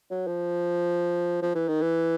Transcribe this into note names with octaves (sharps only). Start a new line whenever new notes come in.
F#3
F3
F3
E3
D#3
E3